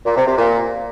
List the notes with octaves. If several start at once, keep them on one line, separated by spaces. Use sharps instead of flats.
A#2
C3
C3
A#2